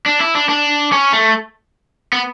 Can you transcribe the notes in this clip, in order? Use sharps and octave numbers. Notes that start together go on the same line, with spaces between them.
D4
E4
D4
D4
C#4
A3
B3